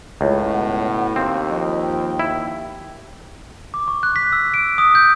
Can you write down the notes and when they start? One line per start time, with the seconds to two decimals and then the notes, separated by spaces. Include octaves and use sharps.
0.21 C#2 A2 C#5
0.53 B2 F#5
1.16 D#2 C4 F5
1.50 F3 D#5
1.81 G5
2.19 E4
3.74 D6
3.88 C#6
4.03 F#6
4.16 B6
4.32 E6
4.54 D7
4.78 D#6
4.95 G6